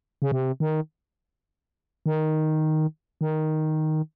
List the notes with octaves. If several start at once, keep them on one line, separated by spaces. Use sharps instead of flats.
C#3
C3
D#3
D#3
D#3